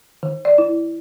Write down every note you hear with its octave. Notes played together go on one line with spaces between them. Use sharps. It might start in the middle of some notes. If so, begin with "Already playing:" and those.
D#3
D5
E4